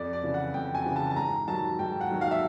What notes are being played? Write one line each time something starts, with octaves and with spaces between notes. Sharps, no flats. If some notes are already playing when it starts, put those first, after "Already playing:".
Already playing: F2 D5
D5
C#3 E3
F#5
F2 G5
G#5
C#3 E3
A5
A5
G#2 A#5
D#3 F#3 A5
G#2 G5
F#5
D#3 F#3
F5
E5